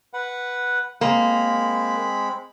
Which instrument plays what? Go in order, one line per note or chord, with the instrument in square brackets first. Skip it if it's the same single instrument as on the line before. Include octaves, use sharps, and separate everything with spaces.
[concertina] B4 F#5
[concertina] G#3 C4 B5 [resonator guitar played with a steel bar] A#3